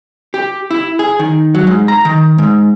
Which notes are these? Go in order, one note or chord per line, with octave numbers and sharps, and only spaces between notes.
G4
E4
G#4
D#3
F#3
G#2
A#5
D#3
G#2